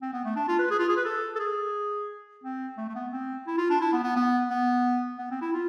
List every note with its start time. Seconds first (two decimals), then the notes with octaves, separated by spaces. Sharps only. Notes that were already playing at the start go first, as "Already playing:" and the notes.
0.02 C4
0.14 B3
0.25 A3
0.36 D4
0.48 F4
0.59 B4
0.71 G#4
0.79 F4
0.89 G#4
0.97 B4
1.05 A4
1.36 A4
1.39 G#4
2.44 C4
2.77 A3
2.89 A3
2.95 B3
3.12 C4
3.47 E4
3.58 F4
3.70 D4
3.81 E4
3.93 B3
4.04 B3
4.16 B3
4.50 B3
5.18 B3
5.31 C4
5.42 E4
5.53 F4